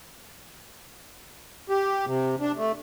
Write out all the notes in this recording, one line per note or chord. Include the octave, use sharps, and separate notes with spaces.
G4
C3
D4
A3